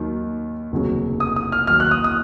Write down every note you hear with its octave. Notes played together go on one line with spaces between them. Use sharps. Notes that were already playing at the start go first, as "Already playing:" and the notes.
Already playing: D#2 D#3 F#3
F1 D#2 C#3 F#3
D#6
D#6
F6
D#2 D#3 F#3 F6
F#6
D#6
D#6